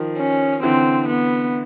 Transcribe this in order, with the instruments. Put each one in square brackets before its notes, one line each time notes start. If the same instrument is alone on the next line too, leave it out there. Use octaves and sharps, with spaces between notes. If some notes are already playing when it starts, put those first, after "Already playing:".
Already playing: [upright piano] D#3 F3
[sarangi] C#4
[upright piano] D3 E3 [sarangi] C4
[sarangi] B3